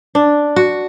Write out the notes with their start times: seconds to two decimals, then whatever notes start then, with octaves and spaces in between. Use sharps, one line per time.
0.15 D4
0.56 F#4